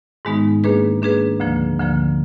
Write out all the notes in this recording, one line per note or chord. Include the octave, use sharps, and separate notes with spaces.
G#2 D#3 G#3 B3 D#4
D#3 A#3 D4 G#4 B4
D#3 A#3 D4 G#4 B4
D2 D3 F3 A#3
D2 D3 F3 A#3